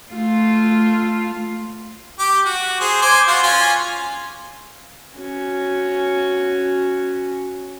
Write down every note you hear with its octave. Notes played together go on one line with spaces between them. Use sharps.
A3 F4
G4 D6
F#4
G#4 C5
C5 G#5 D6
F4 F#4 C6
C#4 F4 G#5
C#4 F#4